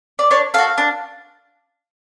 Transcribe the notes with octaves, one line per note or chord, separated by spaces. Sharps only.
D5
D4 C#5
F#4 A4 F5
D4